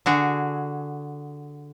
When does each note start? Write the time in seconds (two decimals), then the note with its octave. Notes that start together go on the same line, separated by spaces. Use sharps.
0.06 D3 F#4 G#4